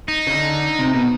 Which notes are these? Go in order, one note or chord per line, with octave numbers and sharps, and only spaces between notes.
D#4
C#3
D3
C3
B2